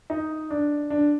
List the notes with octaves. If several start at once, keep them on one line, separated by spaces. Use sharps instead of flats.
D#4
D4
D4